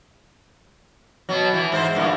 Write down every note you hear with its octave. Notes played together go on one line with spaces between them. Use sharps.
B2 F#3
E3
G#2 C5
G2 A#2 E3